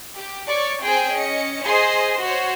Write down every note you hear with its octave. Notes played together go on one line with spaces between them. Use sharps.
G4
C#5 D5 C#6
C4 G#4 C5 G5 G#5
C#4 D#5 C#7
G#4 C5 D#5 C6
F#4 C5 C#5